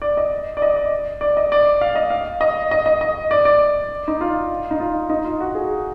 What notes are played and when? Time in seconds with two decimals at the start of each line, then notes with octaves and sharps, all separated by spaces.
0.02 D5
0.17 D#5
0.57 D5
0.62 D#5
0.76 D5
1.21 D5
1.37 D#5
1.52 D5
1.81 F5
1.95 D#5
2.10 F5
2.41 D#5
2.71 D#5
2.86 D#5
3.01 D#5
3.31 D5
3.45 D5
4.08 D#4
4.21 F4
4.71 D#4
4.80 F4
5.10 D#4
5.24 F4
5.40 F#4
5.55 G#4